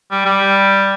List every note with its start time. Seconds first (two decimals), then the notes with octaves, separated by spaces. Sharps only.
0.11 G3
0.25 G3